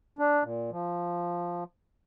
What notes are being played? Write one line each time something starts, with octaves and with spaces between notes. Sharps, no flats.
D4
A#2
F3